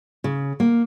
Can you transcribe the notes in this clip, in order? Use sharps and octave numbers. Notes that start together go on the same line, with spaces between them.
C#3
A#3